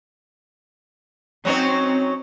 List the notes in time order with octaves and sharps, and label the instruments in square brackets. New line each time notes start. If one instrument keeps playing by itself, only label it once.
[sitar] F#3 C#4 D#4 [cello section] C4